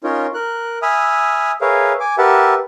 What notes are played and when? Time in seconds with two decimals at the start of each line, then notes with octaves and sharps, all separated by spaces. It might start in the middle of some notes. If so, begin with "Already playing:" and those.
0.04 C#4 D#4 F4 A#4 C#5
0.34 A#4 F#6
0.82 E5 G#5 B5 D#6 F6
1.61 G#4 A#4 B4 C#5 E5 F5
2.00 G#5 D6
2.18 G4 A#4 B4 E5 F#5 A5